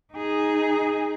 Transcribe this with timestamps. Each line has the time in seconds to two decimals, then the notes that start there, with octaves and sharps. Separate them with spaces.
0.14 D#4 G#4